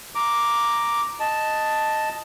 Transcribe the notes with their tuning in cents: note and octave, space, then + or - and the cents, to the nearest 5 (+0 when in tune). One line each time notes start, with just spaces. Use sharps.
A#5 +0 D6 +0
D#5 +0 A5 +0